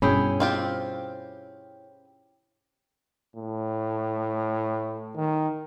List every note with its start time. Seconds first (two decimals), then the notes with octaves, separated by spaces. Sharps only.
0.02 G2 B2 C#4 E4 G#4 G5
0.40 C4 F4 G4
3.36 A2
5.15 D#3